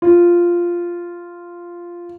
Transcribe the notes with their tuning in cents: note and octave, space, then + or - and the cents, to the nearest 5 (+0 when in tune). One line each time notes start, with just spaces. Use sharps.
F4 -5